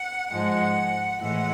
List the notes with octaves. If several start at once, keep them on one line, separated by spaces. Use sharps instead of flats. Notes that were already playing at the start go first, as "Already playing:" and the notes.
Already playing: F#5
G#2 F3 G#3 F#5
A2 E3 G#3 F#5